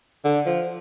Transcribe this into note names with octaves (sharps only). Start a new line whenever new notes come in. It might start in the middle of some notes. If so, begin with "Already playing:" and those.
D3
F3